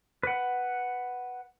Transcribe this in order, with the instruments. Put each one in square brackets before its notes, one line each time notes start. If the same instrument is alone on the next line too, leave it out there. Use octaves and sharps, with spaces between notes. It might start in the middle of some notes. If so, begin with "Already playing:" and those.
[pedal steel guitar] B4 F#5